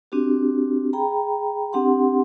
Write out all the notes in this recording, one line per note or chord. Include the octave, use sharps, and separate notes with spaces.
C4 D4 F#4 G4
G#4 G5 A#5 B5
C4 D4 G4 F#5 C6